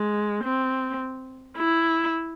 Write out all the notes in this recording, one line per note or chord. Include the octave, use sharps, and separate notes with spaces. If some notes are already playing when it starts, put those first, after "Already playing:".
Already playing: G#3
C4
E4